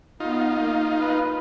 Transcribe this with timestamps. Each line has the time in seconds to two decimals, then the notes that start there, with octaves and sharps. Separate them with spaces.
0.20 B3 D#4 F4
0.59 A#3
0.99 B4 B5